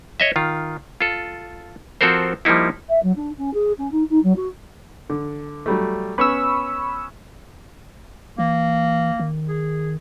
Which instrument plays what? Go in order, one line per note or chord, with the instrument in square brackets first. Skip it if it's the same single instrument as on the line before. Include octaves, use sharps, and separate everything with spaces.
[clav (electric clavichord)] C#5 D#5 E5
D#3 F4
F4 A4
F3 C4 F#4 A4 A#4 C5
F3 G3 A#3 D#4 E4
[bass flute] E5
F#3
D4
C#4
G#4
C#4
D#4
D#4
F#3
F#4
[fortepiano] D3
F#3 G3 A3
[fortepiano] B3 C#4 [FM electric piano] B5 C#6 E6
[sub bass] E3 [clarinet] A#3
[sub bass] D#3
[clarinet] G#4